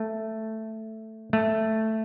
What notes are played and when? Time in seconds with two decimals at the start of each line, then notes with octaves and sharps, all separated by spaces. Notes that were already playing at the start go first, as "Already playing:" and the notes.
Already playing: A3
1.33 A3